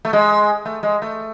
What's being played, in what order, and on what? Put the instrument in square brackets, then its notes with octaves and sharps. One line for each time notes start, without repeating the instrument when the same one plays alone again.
[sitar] A3
G#3
A3
G#3
A3